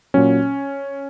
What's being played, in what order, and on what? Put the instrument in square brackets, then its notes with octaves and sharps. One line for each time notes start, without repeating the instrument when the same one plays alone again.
[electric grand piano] A#2 F#3 C#4